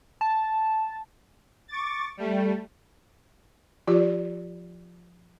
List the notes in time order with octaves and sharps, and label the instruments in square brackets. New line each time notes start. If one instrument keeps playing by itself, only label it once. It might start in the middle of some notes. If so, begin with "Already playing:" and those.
[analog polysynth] A5
[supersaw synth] C#6 D6 A6
G3 A3
[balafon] F3 F4 G4 D5